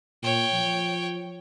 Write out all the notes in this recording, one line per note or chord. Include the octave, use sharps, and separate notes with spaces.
A#2 C#5 G5
F3